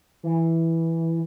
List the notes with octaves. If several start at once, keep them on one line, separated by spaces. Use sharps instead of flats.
E3